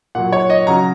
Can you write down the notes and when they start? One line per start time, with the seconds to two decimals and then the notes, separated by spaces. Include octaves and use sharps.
0.15 A#2 F#3 F#5
0.32 C#5
0.50 D#5
0.67 C#3 F#3 A#5